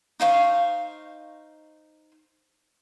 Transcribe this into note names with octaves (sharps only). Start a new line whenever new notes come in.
D#4 C5 F5 C#6